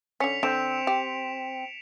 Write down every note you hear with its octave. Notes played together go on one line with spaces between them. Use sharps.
D3 C#4 B6 C#7 F7
D3 C4 D7 E7
G4